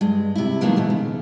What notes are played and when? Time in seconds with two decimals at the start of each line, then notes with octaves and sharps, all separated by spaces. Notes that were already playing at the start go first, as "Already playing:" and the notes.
0.01 G2 G#3
0.35 C3 E4
0.61 D#3 F3 F#3 G#3 A#3 B3
0.76 B2 E3 F3
0.90 C#3